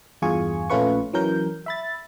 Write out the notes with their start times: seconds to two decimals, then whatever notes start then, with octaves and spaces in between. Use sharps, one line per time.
0.22 E2 G2 F4 G#4 G#5 C#6
0.70 A#1 A3 C#4 F4 B4 C#6
1.13 E3 F#3 C#4 A#4 G6
1.66 E5 B5 A6